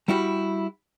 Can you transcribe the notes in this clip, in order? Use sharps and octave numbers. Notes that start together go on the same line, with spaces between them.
G3 E4 F#4 G4